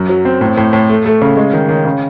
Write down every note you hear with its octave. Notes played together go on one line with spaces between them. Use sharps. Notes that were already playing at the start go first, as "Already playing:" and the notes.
Already playing: F#2
F#3
C4
A2
A2
A2
A3
A3
C#3
G#3
D#3
D#3
C#3